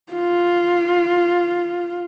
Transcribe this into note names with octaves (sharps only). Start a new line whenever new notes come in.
F4